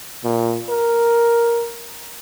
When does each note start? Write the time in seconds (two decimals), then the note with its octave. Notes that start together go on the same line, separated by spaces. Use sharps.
0.24 A#2
0.69 A#4